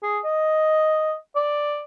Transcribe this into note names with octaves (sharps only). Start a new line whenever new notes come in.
G#4
D#5
D5